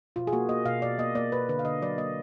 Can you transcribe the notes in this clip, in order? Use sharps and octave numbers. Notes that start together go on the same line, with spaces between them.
B2 F4
G#4
A#3 F#4
A#3 D#5
B2 F5
B2 D5
A#3 D#5
A#3 D5
B2 B4
D3 B4
F5
D3 D#5
F#3 D5
A#3 D#5